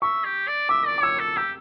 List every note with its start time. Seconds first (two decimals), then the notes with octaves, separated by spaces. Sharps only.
0.02 E5 C#6
0.24 G4
0.48 D5
0.69 E5 D6
0.86 D5
0.98 D6
1.03 C#5 E6
1.19 A4
1.37 G4 E6